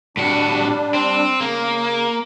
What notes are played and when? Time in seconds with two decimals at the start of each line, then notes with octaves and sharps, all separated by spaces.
0.17 A2 G3 D4 F#4
0.94 C4
1.41 C#3 A#3